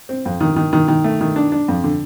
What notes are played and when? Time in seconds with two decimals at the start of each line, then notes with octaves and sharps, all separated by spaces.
0.09 C4
0.26 F2
0.41 D#3
0.56 D#3
0.73 D#3
0.88 D#3
1.04 A3
1.21 D#3
1.36 D4
1.52 D4
1.68 F2
1.84 D3